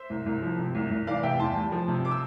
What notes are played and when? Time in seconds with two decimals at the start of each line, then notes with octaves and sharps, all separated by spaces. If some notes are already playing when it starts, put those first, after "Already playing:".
Already playing: C5 E5
0.10 C2
0.26 C2
0.42 F3
0.58 C3
0.75 C2
0.91 C2
1.07 E3 D5 F5
1.23 C3 E5 G5
1.39 E2 A5 C6
1.56 G3
1.72 F3
1.88 C3
2.05 D6
2.11 E6